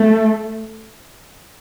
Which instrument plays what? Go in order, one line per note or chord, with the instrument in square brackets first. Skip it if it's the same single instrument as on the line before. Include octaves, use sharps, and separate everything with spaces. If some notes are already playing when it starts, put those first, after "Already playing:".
Already playing: [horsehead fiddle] A3